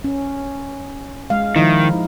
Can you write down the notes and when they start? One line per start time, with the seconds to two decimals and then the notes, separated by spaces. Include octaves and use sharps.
0.04 C#4
1.30 G#3 F5
1.56 D#3 F3 D#4 E4